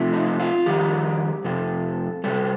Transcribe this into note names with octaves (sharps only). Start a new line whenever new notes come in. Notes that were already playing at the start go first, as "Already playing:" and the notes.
Already playing: C3 F3 A3
D#4
F4
F2 D#3 G3 G4
F2 C3 A4
C3 G3 A4